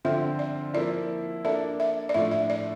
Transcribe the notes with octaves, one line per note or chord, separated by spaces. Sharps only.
D3 F3 C4 F4 C5 E5
D5
F3 A#3 E4 D5
A#3 D4 A4 E5
E5
D5
A2 F3 A3 D4 E5
E5
D5